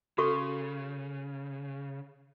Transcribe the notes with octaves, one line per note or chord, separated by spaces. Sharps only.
C#3 F#4 A4 C#6